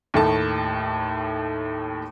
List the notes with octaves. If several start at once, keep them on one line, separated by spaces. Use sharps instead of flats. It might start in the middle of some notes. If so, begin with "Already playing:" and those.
D#2 A2 A3 A5